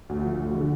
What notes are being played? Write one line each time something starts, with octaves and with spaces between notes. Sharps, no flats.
D2
F3
D2
D3